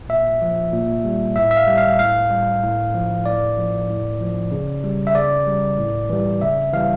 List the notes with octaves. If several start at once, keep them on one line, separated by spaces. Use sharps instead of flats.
A#2 E5
F3
A#2
G3
A2 E5
E5
F5
G3
F5
A2 F5
G3
A2
F3
A2 D5
F3
A2
F3
C#3
G3
E5
C#3 D5
G3
A2
E3 G3
C#3 E5
E3 G3 F5